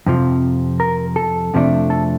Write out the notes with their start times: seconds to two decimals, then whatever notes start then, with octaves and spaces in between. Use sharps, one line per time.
0.06 F2 C3 F3
0.80 A#4
1.16 A4
1.54 F2 C3 F3 A3 D4
1.90 A4